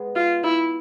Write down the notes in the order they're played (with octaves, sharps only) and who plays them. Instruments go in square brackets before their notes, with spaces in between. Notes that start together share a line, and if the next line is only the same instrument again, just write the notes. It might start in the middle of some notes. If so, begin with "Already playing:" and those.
Already playing: [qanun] G#3 B3
[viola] F4
E4